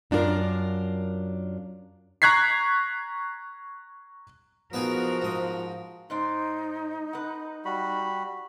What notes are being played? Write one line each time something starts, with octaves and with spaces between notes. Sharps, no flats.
F#2 D4 F4 F#4 A#4
A#5 C#6 F#6 G#6 B6 C7
F3 B3 D#4 F#4 G#4 A#4
G#2 D#6
G#2 D#4 C5 D5
B4 F#5
G3 F#4 B5